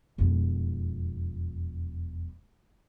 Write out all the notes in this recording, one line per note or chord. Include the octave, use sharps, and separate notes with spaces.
E1 F2